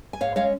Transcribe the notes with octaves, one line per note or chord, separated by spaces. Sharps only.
G#5
G#2 C#5 F5
G#3 C#4 C#5 F5